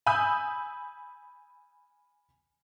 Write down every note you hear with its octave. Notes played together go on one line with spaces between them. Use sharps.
G#5 B5 D#6 E6 G6